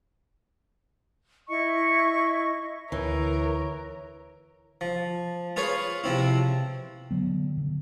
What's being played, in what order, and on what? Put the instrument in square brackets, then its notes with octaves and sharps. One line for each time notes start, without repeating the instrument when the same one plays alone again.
[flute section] E4 D#5 C#6
[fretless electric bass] D2 [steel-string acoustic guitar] E3 [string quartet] A#4 [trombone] C#5
[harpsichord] F3
F4 G#4 B4 C#5 F5
C3 F3 C4 E4
[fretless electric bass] D3 F#3 B3
D3